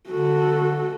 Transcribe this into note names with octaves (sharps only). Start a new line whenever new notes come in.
D3 F#4 A4